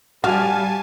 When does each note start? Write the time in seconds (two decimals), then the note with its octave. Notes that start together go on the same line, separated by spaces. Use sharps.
0.24 G3 F#4 F5 G#5 A5